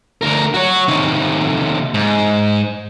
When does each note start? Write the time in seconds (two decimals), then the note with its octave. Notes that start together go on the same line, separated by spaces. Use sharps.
0.22 D2 A#4
0.54 F#4 C#5
0.88 C3 D#3
1.94 G#2